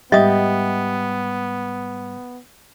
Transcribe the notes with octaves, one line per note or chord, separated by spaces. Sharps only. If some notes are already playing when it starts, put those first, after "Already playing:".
G#2 G3 B3 G4 D#5 E5 D#6